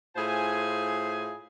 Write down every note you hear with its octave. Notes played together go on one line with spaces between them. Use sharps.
A2 F4 G#4 C5 G#5